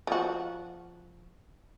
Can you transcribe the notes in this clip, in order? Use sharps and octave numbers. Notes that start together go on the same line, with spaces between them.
F3 F#4